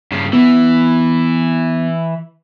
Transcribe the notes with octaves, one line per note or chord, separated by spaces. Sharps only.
G2 C#3
E3 B3